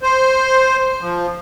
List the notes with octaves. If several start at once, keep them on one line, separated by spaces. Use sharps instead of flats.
C5
F3